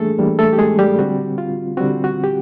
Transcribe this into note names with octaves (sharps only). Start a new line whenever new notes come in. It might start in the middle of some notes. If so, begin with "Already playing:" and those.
Already playing: E3 G3 A3 A#3 D4 G#4 A4
E3 G3 A#3 D4
A3 A4
G4
G#3 G#4
G3 G4
D3 G3 C4 F#4
F4
D3 G3 C4 F#4
F#4
G4